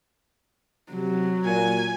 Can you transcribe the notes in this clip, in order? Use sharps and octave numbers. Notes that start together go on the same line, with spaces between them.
C3 F#3
A#2 G#5